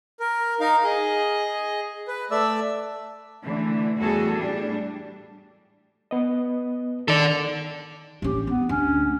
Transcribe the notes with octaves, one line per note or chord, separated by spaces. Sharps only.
A#4
D#4 A#4 F5
G#4 D#5
B4
A3 D5 E5 E6
D3 E3 A3
E2 A2 G3 F#4 G#4 A4
A2 G3 D4
B3 D#5
D#3 A4 D5
A1 C#4 G4
B3 C4
D2 C#4